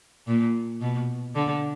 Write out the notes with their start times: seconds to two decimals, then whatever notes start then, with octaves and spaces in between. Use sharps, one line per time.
0.27 A#2
0.81 B2
1.35 D3